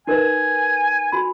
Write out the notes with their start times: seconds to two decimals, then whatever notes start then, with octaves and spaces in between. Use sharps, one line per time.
0.07 D#4 A#4 B4 G#5
1.12 F#4 B5